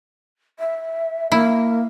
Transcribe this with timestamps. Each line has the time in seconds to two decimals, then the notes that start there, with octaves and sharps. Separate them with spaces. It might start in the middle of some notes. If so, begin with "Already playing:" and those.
0.59 E5
1.32 A#3 E4